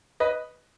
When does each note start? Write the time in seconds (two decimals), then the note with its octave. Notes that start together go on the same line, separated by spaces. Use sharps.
0.20 B4 D#5